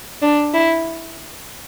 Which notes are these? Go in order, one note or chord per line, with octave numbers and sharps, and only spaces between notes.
D4
E4